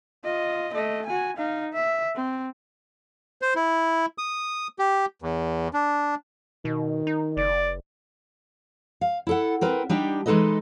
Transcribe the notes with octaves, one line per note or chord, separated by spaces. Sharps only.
F4 D#5
A3 D#5
F#4 G#5
D#4 F5
E5
C4
C5
E4
D#6
G4
E2
D4
B2 D#3
D#4
F#1 D5
F5
E4 A4 F#5
C4 A#4 B4
G3 D4 D#4 G4
E3 G#3 D#4 A4 B4 D#5